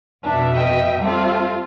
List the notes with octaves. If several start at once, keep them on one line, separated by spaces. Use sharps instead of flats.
F2 B2 D4 E5
D#5 G5
G3 A3 C4 F4